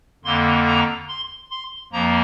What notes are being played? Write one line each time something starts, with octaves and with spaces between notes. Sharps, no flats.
F2 D3 A#3 C6
A#5
C6
C6
F2 F3 A#3 A#5